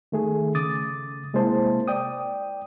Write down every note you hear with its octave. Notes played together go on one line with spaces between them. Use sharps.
D#3 A3 G#4
C#3 D6 D#6 A6
C3 G#3 A#3 E4 C5 A5
D5 G5 D#6